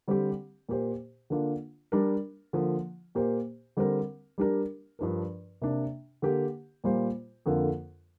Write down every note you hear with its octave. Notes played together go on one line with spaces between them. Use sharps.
D3 G3 C4 G4
A#2 A#3 G4 C5
D3 A#3 D4 F4
G3 D4 A#4
D3 F3 A#3
A#2 A#3 G4 C5
D3 G3 C4 A#4
G3 D4 G4 A#4
G2 F3 D4 A#4
C3 A#3 D4
D3 A#3 G4
A#2 G3 A#3 F4 C5
F2 D3 A#3 F4 A#4